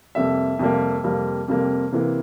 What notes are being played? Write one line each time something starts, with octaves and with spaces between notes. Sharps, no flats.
F2 C3 G3 A#3 E5
F2 C3 G3 A#3
F2 C3 G3 A#3
F2 C3 G3 A#3
C3 E3 A#3